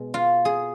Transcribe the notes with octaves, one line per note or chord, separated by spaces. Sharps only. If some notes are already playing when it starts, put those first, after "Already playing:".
Already playing: B2 G#3
F4
G#4